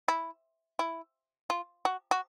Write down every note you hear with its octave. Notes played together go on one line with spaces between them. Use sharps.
E4
E4
F4
F#4
F#4